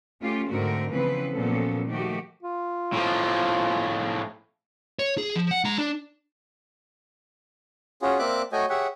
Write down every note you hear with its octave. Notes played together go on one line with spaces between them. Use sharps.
A3 C#4 F4 G4
G#2 D3 A3 C4 F#4 A#4
C#3 E3 F3 B3 C4 B4
A#2 F3 F#3 B3 C#4 A4
D#3 F3 A3 F#4 G4
F4
A2 F3
C#5
G#4
F3
F#5
G#3 A#5
D4
C#4 F4 F#4 G#4
A#3 C4 D5 E5 D6 F#6
A3 F#4 C#5 D#5 G5 G#5
G4 G#4 C#5 E5 F#5